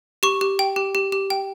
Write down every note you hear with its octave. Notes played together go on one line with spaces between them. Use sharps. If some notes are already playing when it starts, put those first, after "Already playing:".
G4 C#6
G4
G5
G4
G4
G4
G5